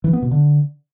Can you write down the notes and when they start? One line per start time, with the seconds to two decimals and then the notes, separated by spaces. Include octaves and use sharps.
0.04 E3
0.13 B3
0.22 B2
0.31 D3